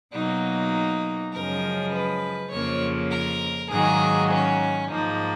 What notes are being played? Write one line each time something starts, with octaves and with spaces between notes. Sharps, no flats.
B2 F#3 A#3 D#4
F#2 C#3 F3 G#3 A#4
B4
F2 C#3 F3 A#3 C#5
A#4
G#2 D#3 F#3 A#3 G#4
C#4
G#2 F3 A#3 D#4